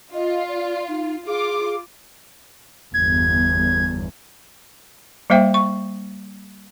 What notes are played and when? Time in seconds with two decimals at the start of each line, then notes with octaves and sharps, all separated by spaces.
0.14 F4 D#5
0.49 D5
0.88 D#4
1.27 F4 G#4 D6
2.94 G1 E2 G#6
5.30 G3 A#3 C5 E5 G5
5.54 C#6